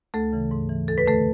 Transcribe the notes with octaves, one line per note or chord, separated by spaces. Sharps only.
D2 A3 A4
C#3 E3
G#2
E3
E2 A4
B4
D3 A3 A4